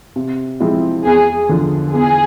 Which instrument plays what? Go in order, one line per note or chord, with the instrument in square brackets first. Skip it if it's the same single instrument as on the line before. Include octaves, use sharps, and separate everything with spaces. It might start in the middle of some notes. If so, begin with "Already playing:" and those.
[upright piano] C3
F3 G#3 C4 E4
[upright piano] E2 [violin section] G#4
[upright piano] D3 F3
[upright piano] E2 [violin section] G#4